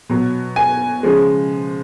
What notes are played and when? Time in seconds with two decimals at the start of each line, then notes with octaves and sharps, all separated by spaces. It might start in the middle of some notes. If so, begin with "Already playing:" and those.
0.10 B2 F#3
0.56 G#5
1.03 C#3 F3 G#3